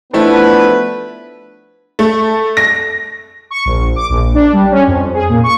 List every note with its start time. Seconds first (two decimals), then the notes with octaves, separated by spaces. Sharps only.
0.13 F3 A3 B3 D4 E4 B4
1.99 A3
2.57 A#6
3.51 C#6
3.65 A#1
3.96 D6
4.09 A#1
4.34 D4
4.53 G3
4.72 C#4
4.87 F2
5.14 G#4
5.29 A#2
5.43 C#6